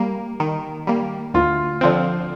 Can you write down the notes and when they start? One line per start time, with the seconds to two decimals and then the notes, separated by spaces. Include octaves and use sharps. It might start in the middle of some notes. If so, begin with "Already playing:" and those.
Already playing: G3 A#3
0.40 D#3
0.87 G3 A#3
1.34 D2 F4
1.81 D3 F3 C4